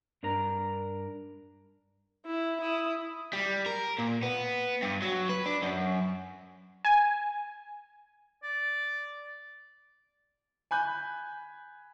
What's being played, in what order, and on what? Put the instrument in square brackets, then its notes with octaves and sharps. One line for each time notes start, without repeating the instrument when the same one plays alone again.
[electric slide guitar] G2 D4 A#4 A#5
[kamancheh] E4
E4 D#6
[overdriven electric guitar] G3
A#4
A#2
B3
G2
F#3
B4
D4
F#2
[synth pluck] G#5
[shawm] D5
[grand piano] G#5 B5 F#6 G6